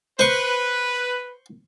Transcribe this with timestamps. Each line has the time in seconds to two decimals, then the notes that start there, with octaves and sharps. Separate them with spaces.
0.19 B4 C5 C#6